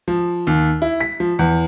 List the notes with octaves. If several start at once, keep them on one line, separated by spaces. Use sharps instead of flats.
F3
D#2
E4
B6
F3
E2